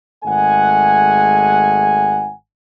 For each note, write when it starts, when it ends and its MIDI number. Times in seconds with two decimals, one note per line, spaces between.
0.25 2.31 32
0.25 2.31 56
0.25 2.31 57
0.25 2.31 78
0.25 2.31 80